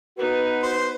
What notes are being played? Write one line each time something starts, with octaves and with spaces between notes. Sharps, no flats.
B3 D#4 F#4 B4
C5